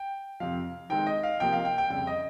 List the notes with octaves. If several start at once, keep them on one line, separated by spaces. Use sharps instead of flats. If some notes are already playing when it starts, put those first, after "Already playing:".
Already playing: G5
F2 C3 F3 C4 F5
D#3 G#3 C4 D#4 G5
D#5
F5
C3 F3 A#3 G5
F5
G5
G5
F2 C#3 G3 G5
D#5